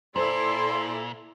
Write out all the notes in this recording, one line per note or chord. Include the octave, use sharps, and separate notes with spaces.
A#2 E4 A4 C5 D5 C6